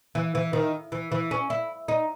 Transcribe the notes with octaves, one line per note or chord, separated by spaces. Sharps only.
E3
E3
D#3
E3
E3
C#4
E4
D#4